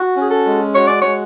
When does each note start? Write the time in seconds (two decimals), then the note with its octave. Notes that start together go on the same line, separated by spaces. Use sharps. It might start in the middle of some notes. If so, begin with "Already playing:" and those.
Already playing: F#4
0.17 C#4
0.22 G#4
0.30 A4
0.46 G#3
0.75 F#4 C#5
0.88 D5
1.01 G#3 C#5